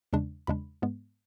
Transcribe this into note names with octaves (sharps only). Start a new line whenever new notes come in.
E2 C#3 G#3 D4
E2 C#3 G#3 D4 B5
G#2 G#3 B3